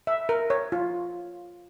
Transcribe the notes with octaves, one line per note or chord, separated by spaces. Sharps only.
E5
A#4
C#5
F4